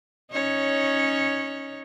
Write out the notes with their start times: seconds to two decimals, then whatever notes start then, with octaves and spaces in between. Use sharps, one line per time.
0.32 C#4 D#4 C#5